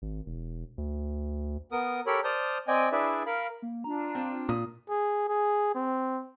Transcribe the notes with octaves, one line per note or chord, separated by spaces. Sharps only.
G#1
E1
D2
B3 A#4 D#6
G4 A4 A#4 C#5 B5
C5 D5 A5 D#6 F6 G6
C4 D5 D#5 G5 G#5
D4 E4 G#4 B4 D5 E5
A#4 F5 B5
A#3
D4 F4 A#5
C4
A#2 D#6
G#4
G#4
C4